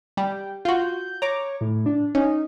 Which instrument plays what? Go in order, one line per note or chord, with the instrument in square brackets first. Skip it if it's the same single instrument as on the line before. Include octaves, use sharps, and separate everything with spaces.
[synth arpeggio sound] G3 [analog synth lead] G5
[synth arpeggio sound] F4 F#4 [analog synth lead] G6
[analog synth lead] C#5 [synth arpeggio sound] A#5 D6
[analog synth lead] A2
D4
[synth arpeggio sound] C#4 [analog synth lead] D#4